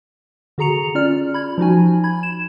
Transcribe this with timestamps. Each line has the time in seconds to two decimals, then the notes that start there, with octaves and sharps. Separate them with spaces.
0.58 D3 F#4 G#4 A#5 C#7 F7
0.95 C#4 F4 D5 F6
1.34 B5 G#6
1.58 F3 D#4 F#4 G#5
2.04 B5 G#6
2.23 E7